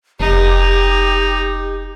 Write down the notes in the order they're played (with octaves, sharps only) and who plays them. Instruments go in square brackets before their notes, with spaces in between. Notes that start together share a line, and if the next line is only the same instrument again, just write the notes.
[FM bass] F1 [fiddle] D#4 [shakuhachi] G4